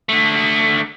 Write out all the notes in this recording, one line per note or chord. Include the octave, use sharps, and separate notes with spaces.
D3 A3